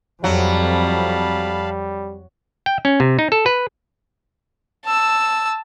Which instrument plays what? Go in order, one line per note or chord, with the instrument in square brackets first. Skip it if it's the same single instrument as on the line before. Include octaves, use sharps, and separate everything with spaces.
[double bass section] F2 [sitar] F#3 [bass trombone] G3 [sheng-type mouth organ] F5 A5 B5
[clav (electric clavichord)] G5
C#4
C3
D#4
A4
B4
[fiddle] A5 E6